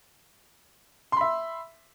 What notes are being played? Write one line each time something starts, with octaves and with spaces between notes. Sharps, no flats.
E5 B5 C6